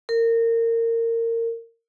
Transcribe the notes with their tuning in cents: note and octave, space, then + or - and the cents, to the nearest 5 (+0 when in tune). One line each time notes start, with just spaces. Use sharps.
A#4 -25